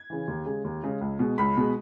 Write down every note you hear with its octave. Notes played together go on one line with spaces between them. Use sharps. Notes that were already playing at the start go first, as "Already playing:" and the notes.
Already playing: G#6
C#3 E3
D#2
C#3 G#3
D#2
C#3 G#3
C#2
B2 G#3
C#2 B5
B2 G#3